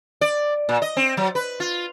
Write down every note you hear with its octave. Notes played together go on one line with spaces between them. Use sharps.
D5
A#2
D#5
C4
F#3
B4
F4